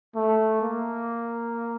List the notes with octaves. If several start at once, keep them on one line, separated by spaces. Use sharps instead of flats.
A3
A#3